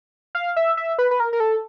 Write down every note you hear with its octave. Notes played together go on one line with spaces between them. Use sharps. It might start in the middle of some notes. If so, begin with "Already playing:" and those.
F5
E5
E5
B4
B4
A#4
A#4
A4